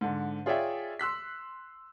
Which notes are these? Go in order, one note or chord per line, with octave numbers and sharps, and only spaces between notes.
G#2 D3
F4 G#4 C#5 D5 E5 G5
C6 E6 F#6 B6